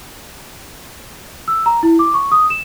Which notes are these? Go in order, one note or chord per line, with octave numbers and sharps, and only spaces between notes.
E6
A#5
E4
D6
C#6
D#6
E7